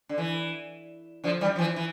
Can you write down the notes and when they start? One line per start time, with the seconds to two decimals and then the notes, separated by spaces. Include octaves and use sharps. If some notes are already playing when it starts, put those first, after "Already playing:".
0.09 D3
0.18 E3
1.24 D3 F3
1.41 E3 G3
1.56 F3
1.59 E3 G3
1.76 E3